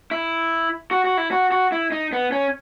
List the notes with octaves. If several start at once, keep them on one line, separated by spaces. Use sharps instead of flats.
E4
F#4
F#4
E4
F#4
F#4
E4
D#4
B3
C#4